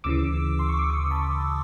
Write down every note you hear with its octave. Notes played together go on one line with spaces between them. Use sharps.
D2 C#3 E3 D6 E6
C6
C#6
D6
C#6 D#6
A5 B5